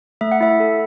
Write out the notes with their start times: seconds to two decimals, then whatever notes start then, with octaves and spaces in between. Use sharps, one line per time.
0.21 A3 E5
0.32 F#5
0.41 E4 E5
0.60 A4